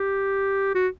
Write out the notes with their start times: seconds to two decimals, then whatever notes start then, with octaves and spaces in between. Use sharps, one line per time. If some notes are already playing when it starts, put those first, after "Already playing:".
Already playing: G4
0.75 F#4